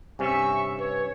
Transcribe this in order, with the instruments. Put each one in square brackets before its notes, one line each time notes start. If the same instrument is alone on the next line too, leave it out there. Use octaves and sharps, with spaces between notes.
[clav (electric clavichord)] G2 C3 C#4 [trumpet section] E5 C#6 [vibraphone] G#5
[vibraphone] B4 [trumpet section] C#5